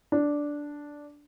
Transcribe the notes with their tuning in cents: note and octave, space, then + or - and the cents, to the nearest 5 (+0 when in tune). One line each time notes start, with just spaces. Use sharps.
D4 -5